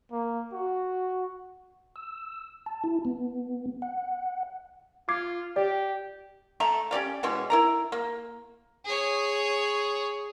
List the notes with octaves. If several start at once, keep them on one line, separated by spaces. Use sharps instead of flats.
A#3
F#4
E6
A5
E4
B3
F#5
F4 D6 G#6 C7
G4 D5
A3 E5 A#5
C#4 G4 D5 F5
B2 E3 G#3 C#4
E4 A#4 A#5
A#3
G#4 C#5